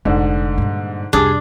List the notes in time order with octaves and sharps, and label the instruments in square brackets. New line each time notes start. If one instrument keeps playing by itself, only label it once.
[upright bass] F1 [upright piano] G#2 D3
[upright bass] G2 A#2
[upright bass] C2 F2 [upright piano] G3 G#4 [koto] D4